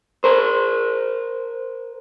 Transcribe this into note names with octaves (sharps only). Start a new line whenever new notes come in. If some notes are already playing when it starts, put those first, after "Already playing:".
A#4 C5